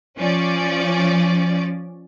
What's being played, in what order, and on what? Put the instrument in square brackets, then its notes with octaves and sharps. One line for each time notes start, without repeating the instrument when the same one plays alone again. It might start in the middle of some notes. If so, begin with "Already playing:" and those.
[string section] F3 C#4 D5